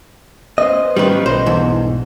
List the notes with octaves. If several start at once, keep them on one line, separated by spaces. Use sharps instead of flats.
B3 C#4 C5 D#5
D#3 F3 G3 B3 C#4 B4
B1 G2 A4 C5 D#5
E2 G#2 E3